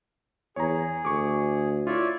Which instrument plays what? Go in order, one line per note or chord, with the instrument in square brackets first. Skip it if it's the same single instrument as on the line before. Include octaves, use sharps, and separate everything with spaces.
[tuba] E2 [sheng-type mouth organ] G#4 [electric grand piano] C#5 A#5
[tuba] D2 [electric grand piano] C#6 D6
[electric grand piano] E4 F4 [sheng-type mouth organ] C#5 D5 E5